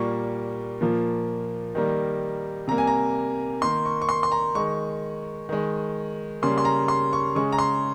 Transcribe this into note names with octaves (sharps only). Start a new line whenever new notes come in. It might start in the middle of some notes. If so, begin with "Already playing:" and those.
Already playing: A#2 G3 A#3 C#6
A#2 F3 A#3
D#3 G3 A#3
C3 G3 A#3 A#5
G#5
A#5
D#3 A#3 C6
C#6
C#6
C6
C6
A#5
D#3 G#3 C#6
D#3 G#3
C#3 G3 A#3 C6
C6
A#5
C6
C#6
C#3 G#3 C#6
A#5
C6